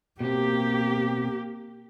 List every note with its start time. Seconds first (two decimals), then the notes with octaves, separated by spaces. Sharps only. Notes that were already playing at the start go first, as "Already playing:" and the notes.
0.20 B2 A#3 C4 G4